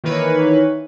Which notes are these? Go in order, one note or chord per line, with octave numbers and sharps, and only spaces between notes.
D#3 E3 A#3 B4 C#5